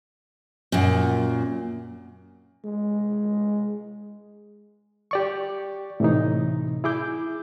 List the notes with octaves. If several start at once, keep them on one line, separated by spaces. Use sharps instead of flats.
F#2 A#2
G#3
G4 D5 C#6
A2 C3 E3 D#4
E4 G#4 D6 G6